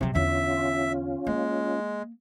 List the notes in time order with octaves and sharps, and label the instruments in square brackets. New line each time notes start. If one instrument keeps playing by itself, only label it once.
[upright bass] C3 F#3
[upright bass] E2 D3 [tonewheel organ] C#4 F4 [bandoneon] E5
[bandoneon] G#3 [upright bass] A#3